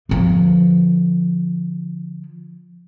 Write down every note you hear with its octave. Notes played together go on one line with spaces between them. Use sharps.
D3 F3